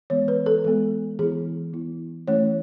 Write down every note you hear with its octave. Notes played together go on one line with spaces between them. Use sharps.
E3 G#3 B3 C#5
B4
A4
E3 G#3 B3 A4
E3 B3 E4 G#4
E3 B3 E4
E3 A3 C#4 E4 C#5